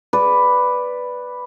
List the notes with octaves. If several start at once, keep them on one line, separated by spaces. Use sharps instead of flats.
B4 D5